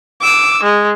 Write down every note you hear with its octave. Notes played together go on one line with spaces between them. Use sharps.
D6 E6
G#3